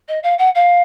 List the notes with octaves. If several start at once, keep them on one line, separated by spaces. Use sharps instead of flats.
D#5
F5
F#5
F5